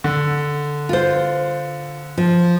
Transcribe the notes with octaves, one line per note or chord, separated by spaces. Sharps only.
D3
F4 C5
F3